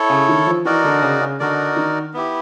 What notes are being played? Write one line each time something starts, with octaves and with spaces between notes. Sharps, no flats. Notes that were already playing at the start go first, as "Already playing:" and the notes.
Already playing: E4 A4 C#5
C#3
D#3
F3
E3 D#4 F#4 A#4 D5
D3
C#3
C#3
D3 D#4 F#4 A#4 D5
D#3
B3 E4 G4